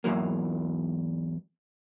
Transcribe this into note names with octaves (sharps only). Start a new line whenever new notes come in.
E2 G#2 E3 F#3 A#3